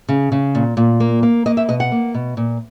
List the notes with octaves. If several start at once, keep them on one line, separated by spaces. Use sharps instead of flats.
C#3
C#3
A#2
A#2
A#3
A#3
A#3 D#5
E5
B2 D#5
F#5
A#3
B2
A#2